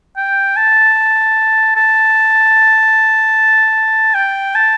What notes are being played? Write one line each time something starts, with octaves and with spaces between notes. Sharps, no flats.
G5
A5
A5
G5
A5